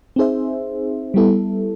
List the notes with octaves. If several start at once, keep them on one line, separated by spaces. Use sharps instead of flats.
C4 D#4 G#4 C5 E5
G3 B3 E4 A4